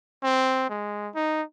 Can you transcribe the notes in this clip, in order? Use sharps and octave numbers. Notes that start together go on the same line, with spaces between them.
C4
G#3
D#4